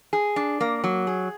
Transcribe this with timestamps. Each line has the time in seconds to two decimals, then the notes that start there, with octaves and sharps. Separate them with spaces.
0.13 G#4
0.36 D4
0.61 A#3
0.84 F#3
1.07 G#4